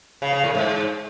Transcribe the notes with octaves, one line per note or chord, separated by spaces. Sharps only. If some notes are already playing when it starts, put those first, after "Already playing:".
C#3
C#3
A2
G#2